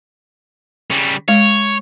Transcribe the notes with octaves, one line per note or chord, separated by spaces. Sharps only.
C#3 G3
G#3 C#5